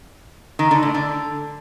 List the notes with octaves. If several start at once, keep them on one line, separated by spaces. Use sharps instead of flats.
D#3
D3
A2
D3